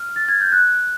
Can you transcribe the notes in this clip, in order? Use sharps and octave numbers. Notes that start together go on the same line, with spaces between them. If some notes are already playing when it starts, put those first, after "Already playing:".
Already playing: F6
A6
G#6
G6
F#6